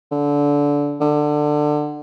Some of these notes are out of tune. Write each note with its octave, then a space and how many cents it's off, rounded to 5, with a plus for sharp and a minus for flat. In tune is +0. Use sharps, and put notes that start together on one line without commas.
D3 -20
D3 +20